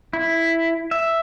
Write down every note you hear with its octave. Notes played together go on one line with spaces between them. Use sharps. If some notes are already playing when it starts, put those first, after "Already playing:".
E4
E5